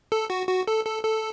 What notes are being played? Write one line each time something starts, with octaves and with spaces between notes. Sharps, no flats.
A4
F#4
F#4
A4
A4
A4